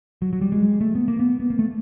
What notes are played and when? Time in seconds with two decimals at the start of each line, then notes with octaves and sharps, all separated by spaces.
0.22 F#3
0.33 F#3
0.41 G3
0.52 G#3
0.81 A3
0.95 B3
1.08 A#3
1.20 B3
1.40 B3
1.50 A#3
1.59 A3